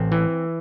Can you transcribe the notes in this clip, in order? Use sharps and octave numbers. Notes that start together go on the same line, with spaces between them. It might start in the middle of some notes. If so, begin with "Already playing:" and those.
Already playing: A1 C4
E3